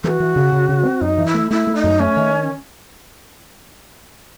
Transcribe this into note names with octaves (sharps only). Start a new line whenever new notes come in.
E3 F#4 A4
E3
C#3
C#3
C#3
C4
F#2 D#4
E3
E4
A3
A3 E4
A3
D#4
F#2
A3 C#4
D#3